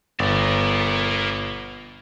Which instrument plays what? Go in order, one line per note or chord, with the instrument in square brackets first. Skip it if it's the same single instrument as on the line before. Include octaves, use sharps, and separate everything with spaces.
[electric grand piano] G1 [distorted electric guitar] A#4 D5